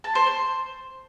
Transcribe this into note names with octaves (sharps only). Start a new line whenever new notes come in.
A5
C5
C5